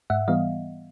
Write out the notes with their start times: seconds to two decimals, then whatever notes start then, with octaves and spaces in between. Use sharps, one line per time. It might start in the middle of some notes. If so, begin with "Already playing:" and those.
0.10 G#2 E5 F#5
0.28 E3 G3 B3 D#5 F5